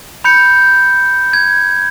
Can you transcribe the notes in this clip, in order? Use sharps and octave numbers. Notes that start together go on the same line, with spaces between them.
B5 G6 C#7
G#6